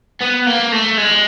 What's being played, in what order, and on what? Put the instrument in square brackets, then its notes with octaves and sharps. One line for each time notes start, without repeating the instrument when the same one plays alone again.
[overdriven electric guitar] B3
A#3
A3
G#3